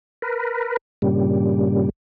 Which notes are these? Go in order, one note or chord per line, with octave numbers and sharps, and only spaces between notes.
A#4 B4
G2 A#2 C#3 G3